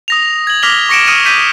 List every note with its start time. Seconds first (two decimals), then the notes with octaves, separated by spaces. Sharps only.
0.08 D#6 A#6 F7
0.47 G#6 F#7
0.63 D6 F6 A#6 B6 F7 G7
0.89 C#6 A#6 C#7 D7 E7
1.07 D#6 F6 C#7 D#7
1.26 G6 B6 D#7